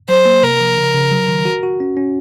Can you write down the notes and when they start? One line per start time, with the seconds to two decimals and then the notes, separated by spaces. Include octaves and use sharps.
0.09 F#3 C5
0.26 A#3
0.43 C3 A#4
0.60 F3
0.77 C#3
0.94 C#3
1.11 F#3
1.29 D#3
1.45 F#4
1.63 F#4
1.80 C#4
1.97 C#4